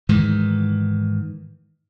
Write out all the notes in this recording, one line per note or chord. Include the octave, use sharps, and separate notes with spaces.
G#2 D#3 E3